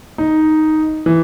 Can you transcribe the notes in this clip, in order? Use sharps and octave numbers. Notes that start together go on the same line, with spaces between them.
D#4
E3